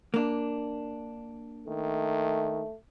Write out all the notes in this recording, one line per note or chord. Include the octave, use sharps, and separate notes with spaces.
A#3 D4
D#3 A3